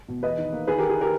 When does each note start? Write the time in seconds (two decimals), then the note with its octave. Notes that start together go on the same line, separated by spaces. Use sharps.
0.08 B2
0.22 E2 B4 D#5
0.38 D#3
0.52 A#3
0.67 D#3 G#4 B4
0.78 D#3 G4 A#4
0.89 G#4
1.01 G4 A#4